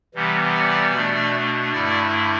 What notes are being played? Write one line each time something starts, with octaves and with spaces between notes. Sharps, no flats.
C3 E3 G3 B3
D5
B2 A3 D4
G2 D3 A3 E4 D5